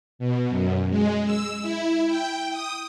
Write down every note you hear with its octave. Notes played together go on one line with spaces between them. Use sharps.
B2
F#2
G#3
E6
E4
G5
D#6